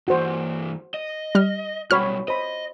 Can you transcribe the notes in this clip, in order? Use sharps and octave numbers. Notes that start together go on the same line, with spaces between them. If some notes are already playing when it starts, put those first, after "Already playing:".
G2 E3 F#4 C5
D#5
G3 F6
B1 G3 F#4 C#5 B5 F6
C5 D#5 B5